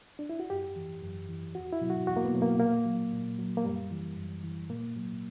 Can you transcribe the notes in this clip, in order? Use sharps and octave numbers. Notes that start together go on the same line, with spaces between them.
D4
E4
F#4
F#2 G4
E3
F#2
E3
E2 F#4
E4
B2 F#3
F#4
E2 F#4
A#3
B3
B2 F#3
A#3
A#2 A#3
F#3
A#2
F#3
A#3
F#2 G3
E3
F#2
E3
A#2 A#3
F#3